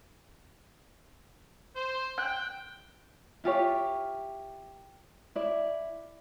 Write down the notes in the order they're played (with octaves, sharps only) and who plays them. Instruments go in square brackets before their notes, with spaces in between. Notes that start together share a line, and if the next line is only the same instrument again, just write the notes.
[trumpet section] C5
[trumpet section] G5 [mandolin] F#6
[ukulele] E4 F4 G4 C#5
E4 D5